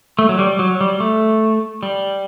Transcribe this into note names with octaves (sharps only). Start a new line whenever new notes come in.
A3
F#3
G3
F#3
G3
A3
G3